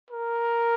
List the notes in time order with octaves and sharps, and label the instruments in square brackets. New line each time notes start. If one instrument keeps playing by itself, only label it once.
[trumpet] A#4